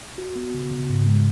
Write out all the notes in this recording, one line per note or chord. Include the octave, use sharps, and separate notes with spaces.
F#4
B3
C#3
C#3
G#2
G#3